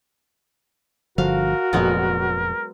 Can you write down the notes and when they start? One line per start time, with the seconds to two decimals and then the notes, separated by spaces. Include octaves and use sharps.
1.18 G1 D3 F3 F#4 A#4 F5
1.73 F1 F2 A#2 F#3 G#3 B3